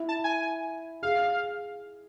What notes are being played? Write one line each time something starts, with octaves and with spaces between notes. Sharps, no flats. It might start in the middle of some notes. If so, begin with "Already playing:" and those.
Already playing: E4
A5
G#5
G#4 F5